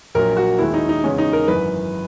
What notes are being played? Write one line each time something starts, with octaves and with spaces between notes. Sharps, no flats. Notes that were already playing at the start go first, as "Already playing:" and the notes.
A#1 A#2 F#3 A#4
F#4
D#2 D#3 G#3 E4
D#4
D#4
E2 C#3 G#3 C#4
D#4
A#4
G#1 F#2 E3 B4